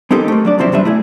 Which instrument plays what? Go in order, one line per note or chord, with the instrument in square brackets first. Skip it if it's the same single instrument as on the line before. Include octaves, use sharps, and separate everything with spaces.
[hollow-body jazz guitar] G#3 C4 D#4 G4 A4 A#4
A3 A#3
F#3 D4 D5
G2 C3 F3 F#3 C4 E4
C2 G2 G3 D4 B4 E5
A3 E4 G#4